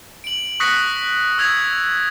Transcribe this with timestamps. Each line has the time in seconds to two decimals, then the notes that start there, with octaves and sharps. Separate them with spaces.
0.24 D7 F#7
0.60 C#6 D#6 F#6 A#6 B6 C#7
1.38 D#6 E6 G#6 A#6 F7